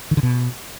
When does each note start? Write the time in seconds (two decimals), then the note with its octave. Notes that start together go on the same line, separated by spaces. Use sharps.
0.11 D#3
0.17 D3
0.23 B2